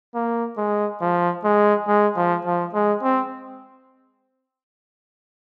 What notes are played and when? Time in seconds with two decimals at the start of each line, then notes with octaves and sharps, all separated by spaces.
0.15 A#3
0.57 G#3
1.01 F3
1.44 G#3
1.88 G#3
2.16 F3
2.45 F3
2.74 G#3
3.03 C4